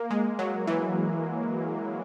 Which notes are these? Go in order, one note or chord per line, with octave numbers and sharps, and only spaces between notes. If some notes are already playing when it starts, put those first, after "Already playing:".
Already playing: A#3
G#3
F#3
E3